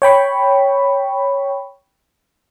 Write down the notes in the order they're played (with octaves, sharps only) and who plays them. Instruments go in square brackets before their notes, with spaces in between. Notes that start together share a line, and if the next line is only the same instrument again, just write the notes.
[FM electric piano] C#5 G5 B5 C#6